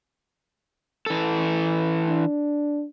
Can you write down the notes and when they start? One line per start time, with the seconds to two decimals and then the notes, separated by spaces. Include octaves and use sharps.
1.06 E3 A4
2.08 D4